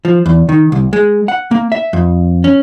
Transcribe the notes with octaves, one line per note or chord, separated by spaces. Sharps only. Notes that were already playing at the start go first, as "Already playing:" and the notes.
F3
E2
D#3
C2
G#3
F#5
A#3
E5
F2
C#4